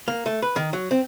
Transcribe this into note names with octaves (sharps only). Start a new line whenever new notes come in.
A#3
A3
B4
D#3
F#3
C4